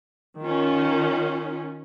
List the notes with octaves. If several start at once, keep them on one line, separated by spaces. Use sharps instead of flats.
D#3 C#4 F4